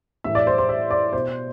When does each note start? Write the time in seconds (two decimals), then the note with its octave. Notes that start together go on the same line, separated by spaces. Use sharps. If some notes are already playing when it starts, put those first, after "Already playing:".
0.24 A2 E3 E5
0.35 D5
0.47 C5
0.58 C5
0.69 E5
0.91 D5
1.13 B2 C5